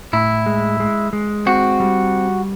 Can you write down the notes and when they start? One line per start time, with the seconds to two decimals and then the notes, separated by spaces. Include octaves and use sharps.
0.13 A2 E4
0.46 G#3
0.80 G#3
1.13 G#3
1.46 C4 F#4
1.80 G3